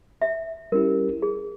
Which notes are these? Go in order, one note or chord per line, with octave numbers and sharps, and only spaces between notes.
E5
G3 C#4 E4 G4 A#4
G#4